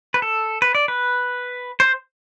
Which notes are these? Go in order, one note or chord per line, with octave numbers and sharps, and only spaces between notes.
B4
A4
B4
D5
B4
C5